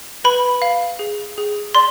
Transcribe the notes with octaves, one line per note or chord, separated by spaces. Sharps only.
B4 B5
F5
G#4
G#4
D5 C6